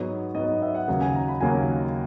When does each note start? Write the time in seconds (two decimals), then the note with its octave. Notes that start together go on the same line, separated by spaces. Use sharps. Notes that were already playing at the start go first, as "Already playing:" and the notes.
Already playing: G#2 F#3 B3 C#5
0.35 G#2 F#3 B3 D#5
0.62 E5
0.75 F#5
0.88 D#2 C#3 F#3 A#3 F#5
1.01 G#5
1.15 A#5
1.28 B5
1.41 D#2 C#3 F#3 A#3 G#5